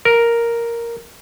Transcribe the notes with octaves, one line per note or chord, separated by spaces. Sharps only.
A#4